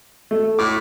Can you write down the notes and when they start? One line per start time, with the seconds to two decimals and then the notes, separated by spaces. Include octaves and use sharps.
0.31 A3
0.59 A2 D6